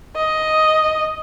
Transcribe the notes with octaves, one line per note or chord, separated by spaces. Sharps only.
D#5